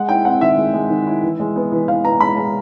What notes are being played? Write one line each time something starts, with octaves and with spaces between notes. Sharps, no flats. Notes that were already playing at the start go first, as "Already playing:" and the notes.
Already playing: G#3 F#5
E4 G5
C4 F#5
D#3 E5
G#3
G#3
D#3
E4
E3
G#3
B3
E3
E3 F5
B3 A#5
G#3 B5
G#3 A#5